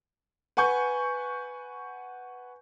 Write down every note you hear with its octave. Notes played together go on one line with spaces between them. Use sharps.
B4 F#5 G#5 C#6 G6